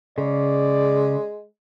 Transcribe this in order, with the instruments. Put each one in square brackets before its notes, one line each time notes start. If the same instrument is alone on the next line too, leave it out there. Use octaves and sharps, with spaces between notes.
[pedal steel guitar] C#3 [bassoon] G#3 [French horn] D5